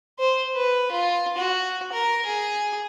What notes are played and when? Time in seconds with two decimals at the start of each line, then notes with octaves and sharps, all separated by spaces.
0.19 C5
0.56 B4
0.91 F4
1.37 F#4
1.92 A#4
2.25 G#4